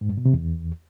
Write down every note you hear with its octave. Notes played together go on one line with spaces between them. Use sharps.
G#2
G2
B2
C3
E2